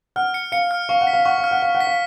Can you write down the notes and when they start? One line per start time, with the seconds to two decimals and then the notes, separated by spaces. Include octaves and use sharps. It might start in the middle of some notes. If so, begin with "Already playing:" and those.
0.16 F#5 F6
0.34 C#7
0.52 F5 C#7
0.71 F6
0.89 F5 C#6
1.01 F#5
1.07 B6
1.13 F5
1.25 F#5 C#6
1.38 F5
1.44 F6
1.51 F#5
1.62 F5 F6
1.75 F#5
1.80 B6
1.87 F5